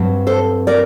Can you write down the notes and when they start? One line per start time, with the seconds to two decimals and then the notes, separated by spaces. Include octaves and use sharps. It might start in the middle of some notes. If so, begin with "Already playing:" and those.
Already playing: G2 F#3 C4
0.27 A4 C5
0.67 A#4 D5